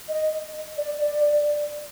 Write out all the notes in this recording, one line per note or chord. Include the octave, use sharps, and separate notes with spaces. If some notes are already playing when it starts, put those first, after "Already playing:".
D#5
D5